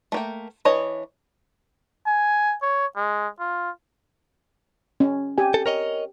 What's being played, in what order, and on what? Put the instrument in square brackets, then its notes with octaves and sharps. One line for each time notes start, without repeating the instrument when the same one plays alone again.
[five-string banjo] A3 A#3 G5
E3 D4 C#5 D#5
[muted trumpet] G#5
C#5
G#3
F4
[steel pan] C#4
G4 G#5
[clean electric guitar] A4
A#4 C#5 D#5